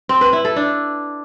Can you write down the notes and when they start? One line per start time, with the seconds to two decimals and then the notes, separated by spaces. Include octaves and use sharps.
0.09 C4
0.21 B4
0.33 E4
0.45 A4
0.56 D4